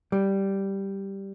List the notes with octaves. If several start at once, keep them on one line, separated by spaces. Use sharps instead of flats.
G3